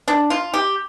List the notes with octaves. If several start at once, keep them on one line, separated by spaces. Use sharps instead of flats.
D4
F4
G4